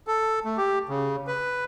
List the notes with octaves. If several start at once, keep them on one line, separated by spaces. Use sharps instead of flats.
A4
A3
G4
C#3
B4